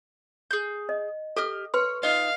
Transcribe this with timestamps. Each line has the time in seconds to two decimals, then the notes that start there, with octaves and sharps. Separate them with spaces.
0.51 G#4 G6
0.89 D#5
1.37 G4 A4 D#5 F6
1.74 B4 C#5 C6
2.03 D#4 F4 D#5 F5